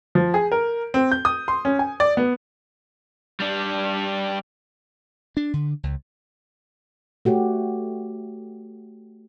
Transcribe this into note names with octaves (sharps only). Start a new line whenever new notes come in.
F3
G#4
A#4
C4
G6
D#6
C6
C#4
G#5
D5
B3
G3 D4
D4
D3
C#2
A3 F#4 G4 C#5